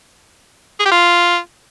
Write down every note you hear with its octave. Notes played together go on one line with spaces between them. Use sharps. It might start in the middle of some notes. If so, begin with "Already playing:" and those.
G#4
G4
F4